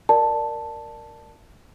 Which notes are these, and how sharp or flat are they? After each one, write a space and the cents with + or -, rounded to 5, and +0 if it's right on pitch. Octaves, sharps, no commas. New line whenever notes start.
A#4 +0 D5 +15 A5 +0